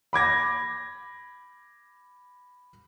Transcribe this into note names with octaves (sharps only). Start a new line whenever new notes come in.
B5 D6 G#6 A#6